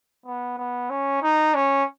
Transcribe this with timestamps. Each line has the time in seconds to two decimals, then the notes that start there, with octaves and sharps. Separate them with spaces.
0.26 B3
0.58 B3
0.90 C#4
1.22 D#4
1.55 C#4